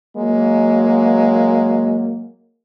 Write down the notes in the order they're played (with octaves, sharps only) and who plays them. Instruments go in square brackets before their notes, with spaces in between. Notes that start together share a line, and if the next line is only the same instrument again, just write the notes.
[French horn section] F#3 G#3 A#3